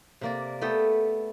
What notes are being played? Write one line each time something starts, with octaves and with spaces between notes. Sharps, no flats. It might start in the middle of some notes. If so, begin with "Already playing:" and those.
C3 A#3 D5
A3 B3 A4 G5